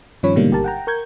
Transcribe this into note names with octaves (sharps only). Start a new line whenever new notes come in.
G2 D#3 F3 C#4 C#5 B5
G#2 B2 D3 G3 A#3 D#4
G#1 G4 A#4 A5
F#5 G5 A#5
A#4 C#6 G6 G#6